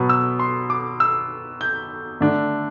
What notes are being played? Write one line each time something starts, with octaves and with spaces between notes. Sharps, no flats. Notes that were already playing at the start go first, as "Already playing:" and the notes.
Already playing: B2 F#3 B3
E6
C6
D6
E6
G6
D3 A3 D4